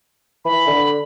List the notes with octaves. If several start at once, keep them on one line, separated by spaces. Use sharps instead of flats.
E3 B5
D3